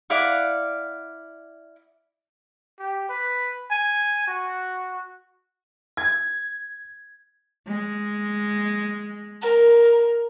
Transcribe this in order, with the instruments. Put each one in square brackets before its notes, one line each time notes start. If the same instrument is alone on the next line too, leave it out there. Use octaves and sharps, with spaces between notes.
[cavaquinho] E4 D5 F5 F#5
[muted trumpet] G4
B4
G#5
F#4
[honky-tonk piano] G#6
[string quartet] G#3
A#4